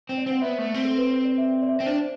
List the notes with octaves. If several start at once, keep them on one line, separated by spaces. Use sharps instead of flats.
C4
D5
C4 F#5
B3 E5
A3
C4
A4
B4
C5
D5
E5
D5
E5
D5
C4
D4 C5